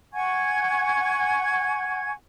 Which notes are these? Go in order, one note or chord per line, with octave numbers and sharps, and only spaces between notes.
F#5 G#5 C#6 G#6